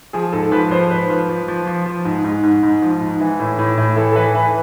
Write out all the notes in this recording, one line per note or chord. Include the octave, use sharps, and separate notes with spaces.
F3 G#4
G#2 A4
A4
F3 B4
F3 C5
G#2 B4
F3
F3
F3
F3
F3
G#2
G#2
G#2
G#2
F3
G#2
E3
A2
A2
A2
E3 A4
A4
E3 B4
E3 B4